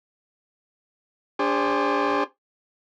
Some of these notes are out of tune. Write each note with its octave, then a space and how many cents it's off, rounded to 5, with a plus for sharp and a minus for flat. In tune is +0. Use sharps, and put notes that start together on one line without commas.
D4 -30 G#4 -45 C5 +0